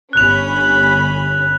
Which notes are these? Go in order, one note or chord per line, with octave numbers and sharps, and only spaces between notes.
G1 C#4 B5 F#6 F7